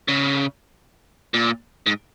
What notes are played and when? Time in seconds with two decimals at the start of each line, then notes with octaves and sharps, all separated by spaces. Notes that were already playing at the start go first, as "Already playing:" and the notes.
0.08 C#3
1.34 A#2
1.86 G#2